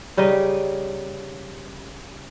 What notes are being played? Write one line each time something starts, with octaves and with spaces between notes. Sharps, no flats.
C#3 G3 D#4 D#5